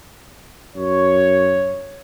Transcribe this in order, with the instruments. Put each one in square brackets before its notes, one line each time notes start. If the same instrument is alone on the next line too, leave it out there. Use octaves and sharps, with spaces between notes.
[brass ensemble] F#2 C#5